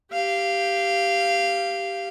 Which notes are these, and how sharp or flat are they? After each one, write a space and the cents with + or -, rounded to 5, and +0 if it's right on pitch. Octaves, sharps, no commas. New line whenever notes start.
G4 +0 F5 -15